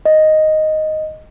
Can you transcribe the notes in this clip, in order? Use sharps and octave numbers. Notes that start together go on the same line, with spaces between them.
D#5